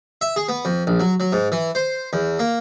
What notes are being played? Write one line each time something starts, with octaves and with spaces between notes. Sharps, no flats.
E5
G#4
B3
F2
A#1
F#3
F#3
G#2
E3
C5
E2
A#3